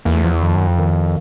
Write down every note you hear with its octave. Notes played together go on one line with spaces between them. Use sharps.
E2 A#3
A3
F3
E3
F2 D#3
F#2
F2
D#3